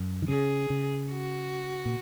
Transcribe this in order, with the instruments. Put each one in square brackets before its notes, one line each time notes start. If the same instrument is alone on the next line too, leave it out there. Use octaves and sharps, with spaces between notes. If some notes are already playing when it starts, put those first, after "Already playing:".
Already playing: [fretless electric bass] F#2
D#3
[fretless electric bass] C#3 [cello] G#4
[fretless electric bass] C#3
[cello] F#4
[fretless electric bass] A#2